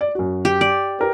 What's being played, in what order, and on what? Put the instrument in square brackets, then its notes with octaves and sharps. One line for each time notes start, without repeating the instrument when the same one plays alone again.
[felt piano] D5
F#2 F#4
[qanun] G4
D5
[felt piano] G4 A#4 B4